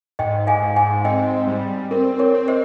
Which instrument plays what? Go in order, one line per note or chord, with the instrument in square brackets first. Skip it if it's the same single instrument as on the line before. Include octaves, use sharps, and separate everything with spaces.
[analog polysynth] G#2 [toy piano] D#5 G5
[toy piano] F5 G#5
[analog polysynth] G#2
[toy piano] F5 G#5
[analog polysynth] C4 [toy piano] D#5 G5
[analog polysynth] G3
[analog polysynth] C4 [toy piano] A#4
[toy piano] A#4 C#5
[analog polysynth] C4
[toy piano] C5 D#5